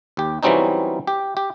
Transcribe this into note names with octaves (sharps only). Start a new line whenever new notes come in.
D#2 G4
E3 F#3 G3 C4 C#4 D#4
G4
G4